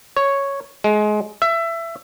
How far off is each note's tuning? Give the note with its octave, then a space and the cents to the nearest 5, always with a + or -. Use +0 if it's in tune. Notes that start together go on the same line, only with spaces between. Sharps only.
C#5 +0
G#3 +25
E5 +20